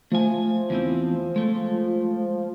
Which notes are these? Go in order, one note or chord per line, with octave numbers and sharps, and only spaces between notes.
F3 A3 G#5
E2 E3 C4
G#3 A3